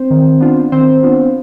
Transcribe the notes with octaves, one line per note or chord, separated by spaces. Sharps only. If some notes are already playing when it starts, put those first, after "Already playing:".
Already playing: C4 C5
D#3
B3 D4 F4
D#3 C4 C5
B3 D4 F4